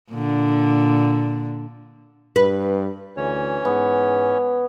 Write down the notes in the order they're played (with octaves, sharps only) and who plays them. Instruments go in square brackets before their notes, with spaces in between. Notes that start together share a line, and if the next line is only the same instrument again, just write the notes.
[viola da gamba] A#2 D3
[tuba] G2 [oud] B4
[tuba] D2 [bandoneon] E3 C#4 C#5
[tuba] G#2 [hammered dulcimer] B3